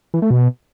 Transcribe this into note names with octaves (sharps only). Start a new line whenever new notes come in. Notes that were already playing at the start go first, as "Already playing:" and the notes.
E3
A3
B2